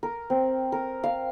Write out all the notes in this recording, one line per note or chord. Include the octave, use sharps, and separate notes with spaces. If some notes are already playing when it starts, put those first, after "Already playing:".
A#4
C4
A#4
F5